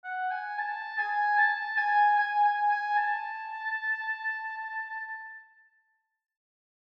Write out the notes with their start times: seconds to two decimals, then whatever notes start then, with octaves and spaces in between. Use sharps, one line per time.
0.05 F#5
0.31 G#5
0.58 A5
0.98 G#5
1.38 A5
1.77 G#5
2.18 G#5
2.44 G#5
2.71 G#5
2.97 A5